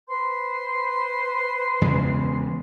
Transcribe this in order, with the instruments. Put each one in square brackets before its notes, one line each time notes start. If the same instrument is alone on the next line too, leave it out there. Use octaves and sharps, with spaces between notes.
[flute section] B4 C5 C6
[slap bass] E2 C#3 G#3